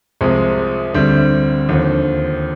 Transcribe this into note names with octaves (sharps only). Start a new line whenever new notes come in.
C2 C3 F3 G#3
D2 D3 G3 C4
D#2 D3 F3